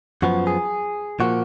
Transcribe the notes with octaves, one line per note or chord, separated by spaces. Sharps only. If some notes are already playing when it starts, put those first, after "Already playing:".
F#2 F3 B3 F#4
G#4
A#2 F3 A#3 F#4